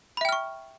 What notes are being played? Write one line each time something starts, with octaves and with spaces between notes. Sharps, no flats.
E5 G5 B5 C#6 F6